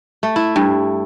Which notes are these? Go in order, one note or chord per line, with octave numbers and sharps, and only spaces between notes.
A3
E4
G2